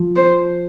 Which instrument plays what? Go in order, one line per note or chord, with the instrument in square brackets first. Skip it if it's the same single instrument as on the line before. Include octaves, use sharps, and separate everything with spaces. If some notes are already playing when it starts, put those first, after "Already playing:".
Already playing: [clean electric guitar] F3
[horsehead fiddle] C5